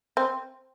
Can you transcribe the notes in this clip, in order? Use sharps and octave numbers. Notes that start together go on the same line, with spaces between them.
C4